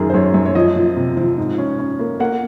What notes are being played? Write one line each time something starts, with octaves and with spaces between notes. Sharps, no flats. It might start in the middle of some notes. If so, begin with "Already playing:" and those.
Already playing: F#2 D#3 G#4 A#4
C5
F#2 C#5
F#2 C#5
C#5
F3 D#5
F3
C3
F3
G#2
C#4
C#4
A#3
A#3 F#5